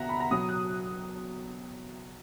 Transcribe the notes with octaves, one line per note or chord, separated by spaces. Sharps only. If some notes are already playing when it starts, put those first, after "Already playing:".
Already playing: B2 E5 F#5 A#5
B5
A#5
B2 F#3 D#6
F#6